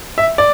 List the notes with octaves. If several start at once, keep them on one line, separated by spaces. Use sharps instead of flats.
E5
D5